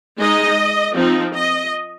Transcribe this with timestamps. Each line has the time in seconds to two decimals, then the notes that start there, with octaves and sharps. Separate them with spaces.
0.20 G#3 D#4 D#5
0.96 F3 C4 D#4
1.34 D#5